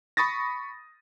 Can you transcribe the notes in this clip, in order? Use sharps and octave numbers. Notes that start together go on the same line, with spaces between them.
B5 C#6 D#6 A6 A#6